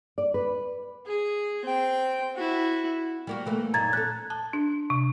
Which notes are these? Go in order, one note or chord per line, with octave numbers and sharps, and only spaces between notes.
D5
B4
G#4
C4 G5
E4 F#4
G3 A#3 F#4
E3 A3 A#3
F#2 A#2 D#4 A#5 G#6 A6
C#4 A4 F#6
A5
D4
C3